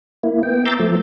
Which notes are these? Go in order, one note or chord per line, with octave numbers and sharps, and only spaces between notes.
A#3 E4
B3 G5
A#5 C6 D6 E6 G6 A6
F3 A3